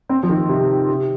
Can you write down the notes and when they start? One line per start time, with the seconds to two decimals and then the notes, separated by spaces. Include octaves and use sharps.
0.09 C4
0.23 F3
0.29 D#3
0.49 C3
0.89 C3